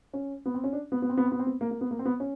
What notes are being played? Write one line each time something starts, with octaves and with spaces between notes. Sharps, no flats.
C#4
B3
C4
C#4
D4
B3
B3
C4
B3
C4
B3
C4
B3
A#3
A#3
B3
A#3
C4
B3
C#4